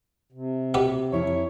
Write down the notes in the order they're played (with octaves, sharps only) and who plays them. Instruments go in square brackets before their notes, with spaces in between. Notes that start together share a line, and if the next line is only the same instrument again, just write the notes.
[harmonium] C3
[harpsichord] B2 B3 G4
[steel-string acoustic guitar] F2 E4 A#4 [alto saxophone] C#5